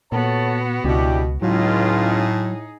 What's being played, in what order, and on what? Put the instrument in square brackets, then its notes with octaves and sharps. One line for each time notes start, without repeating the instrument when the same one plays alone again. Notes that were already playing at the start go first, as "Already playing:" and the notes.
[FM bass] A#2 [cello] B3 F#4 [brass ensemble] A4 C#5 A5
[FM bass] C#2 [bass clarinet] B2 [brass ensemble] D4 E4 G4
[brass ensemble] C#2 F4 [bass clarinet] A2 [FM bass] F#3 [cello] D#4 G#4